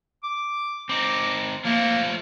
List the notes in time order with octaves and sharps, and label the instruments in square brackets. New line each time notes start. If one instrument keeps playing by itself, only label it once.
[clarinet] D6
[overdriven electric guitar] C4 D#4 [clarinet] D6
[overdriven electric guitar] F3 A3 [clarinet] A#3